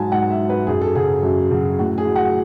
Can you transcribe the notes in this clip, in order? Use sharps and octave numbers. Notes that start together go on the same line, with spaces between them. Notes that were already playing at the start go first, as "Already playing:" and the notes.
Already playing: G#2 F#3 G#5 A5
G#2 F#5
E5
F#3
B4
F#2 G#4
A4
C#3 F#3 G#4
F#2
C#3 F#3
A2 F#4
G#4
F#3
F#5